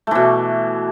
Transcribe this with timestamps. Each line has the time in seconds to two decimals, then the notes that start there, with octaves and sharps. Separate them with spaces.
0.07 A3
0.11 E3
0.15 B2